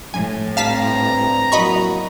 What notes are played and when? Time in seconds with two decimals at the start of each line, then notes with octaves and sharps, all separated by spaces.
0.14 A2 G#5
0.57 G2 C4 F5 A5 A#5 B6
1.52 F#3 A#3 E4 F#4 D#5 B5 C#6